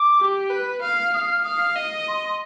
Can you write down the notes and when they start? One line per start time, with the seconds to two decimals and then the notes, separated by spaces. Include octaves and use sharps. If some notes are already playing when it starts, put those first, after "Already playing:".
Already playing: D6
0.20 G4
0.50 B4
0.82 F5
1.14 F5 D#6
1.30 F6
1.44 F5 D#6
1.76 D#5
2.08 C6
2.23 C6